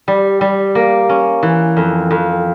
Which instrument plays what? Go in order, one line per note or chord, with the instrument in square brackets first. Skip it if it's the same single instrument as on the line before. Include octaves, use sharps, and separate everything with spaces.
[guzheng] G3
G3
A#3
C#4
E3
F2
F2